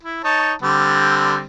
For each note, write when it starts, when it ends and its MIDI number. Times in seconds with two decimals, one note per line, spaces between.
0.03 0.22 64
0.24 0.54 63
0.24 0.54 73
0.24 0.54 81
0.62 1.44 50
0.62 1.44 55
0.62 1.44 60